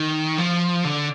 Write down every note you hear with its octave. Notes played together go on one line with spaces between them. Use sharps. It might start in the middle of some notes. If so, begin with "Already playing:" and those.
Already playing: D#3
F3
D3